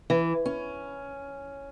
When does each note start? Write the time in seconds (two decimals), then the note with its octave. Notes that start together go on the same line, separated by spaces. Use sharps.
0.10 E3
0.46 C#4